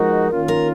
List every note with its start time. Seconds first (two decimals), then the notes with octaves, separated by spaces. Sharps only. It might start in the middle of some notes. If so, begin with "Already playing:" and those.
Already playing: F3 G#3 D#4 F#4 A#4
0.31 D#3 A#3 C#4 F4
0.48 A#4